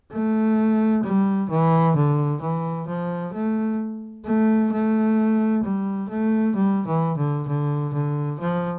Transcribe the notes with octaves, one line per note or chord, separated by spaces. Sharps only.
A3
G3
E3
D3
E3
F3
A3
A3
A3
G3
A3
G3
E3
D3
D3
D3
F3